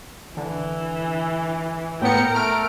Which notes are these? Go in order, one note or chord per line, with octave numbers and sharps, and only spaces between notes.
D3 E3
A2 B3 A#4 G5 C#7
A3 F6 D7